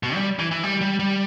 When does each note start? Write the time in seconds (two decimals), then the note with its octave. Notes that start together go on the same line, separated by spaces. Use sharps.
0.03 B2
0.15 G3
0.39 E3
0.51 E3
0.64 G3
0.81 G3
0.99 G3